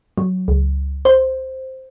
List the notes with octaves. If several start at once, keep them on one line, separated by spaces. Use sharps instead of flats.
F#3
C#2
C5